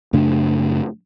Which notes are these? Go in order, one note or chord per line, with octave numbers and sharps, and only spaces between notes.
F#2 C#3 A3 D4